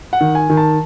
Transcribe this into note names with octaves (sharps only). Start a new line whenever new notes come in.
F#5
D#3
G#5
D#3
A5